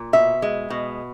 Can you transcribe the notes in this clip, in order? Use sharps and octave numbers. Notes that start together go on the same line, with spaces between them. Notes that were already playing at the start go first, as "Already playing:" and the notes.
Already playing: A#2
B2 E5
G#3
B2